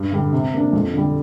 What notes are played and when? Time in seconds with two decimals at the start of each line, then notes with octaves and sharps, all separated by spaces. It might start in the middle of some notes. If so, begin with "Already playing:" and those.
Already playing: G2
0.12 D3 G3
0.33 C3
0.53 A#3 D4
0.73 F2
0.93 D3 G3